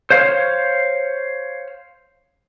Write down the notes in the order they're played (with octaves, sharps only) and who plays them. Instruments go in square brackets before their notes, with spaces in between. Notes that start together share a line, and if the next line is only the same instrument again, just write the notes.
[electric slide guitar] C5 C#5 F5